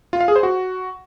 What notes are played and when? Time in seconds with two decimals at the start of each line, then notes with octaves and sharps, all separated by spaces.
0.13 F4
0.21 F5
0.28 G#4
0.36 C5
0.43 F#4